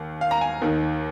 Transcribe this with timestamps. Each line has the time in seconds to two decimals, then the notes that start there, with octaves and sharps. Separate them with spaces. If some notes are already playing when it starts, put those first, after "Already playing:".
Already playing: D#2
0.21 F5
0.31 A#5
0.41 G#5
0.62 D#2 D#3